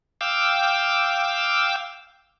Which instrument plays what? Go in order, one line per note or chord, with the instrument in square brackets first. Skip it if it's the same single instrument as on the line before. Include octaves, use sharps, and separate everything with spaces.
[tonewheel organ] F5 G5 D6 E6